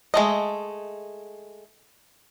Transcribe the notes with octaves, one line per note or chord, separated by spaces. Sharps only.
G#3 A3 D#5